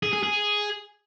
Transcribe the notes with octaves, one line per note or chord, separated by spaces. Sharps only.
G#4
G#4
G#4